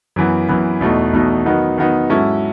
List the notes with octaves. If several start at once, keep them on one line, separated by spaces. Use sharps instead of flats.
F#2 E3 B3
F#2 E3 B3
E2 B2 A3 D#4
E2 B2 A3 D#4
D#3 F#3 B3 D#4
D#3 F#3 B3 D#4
G#2 F#3 C#4 E4 A4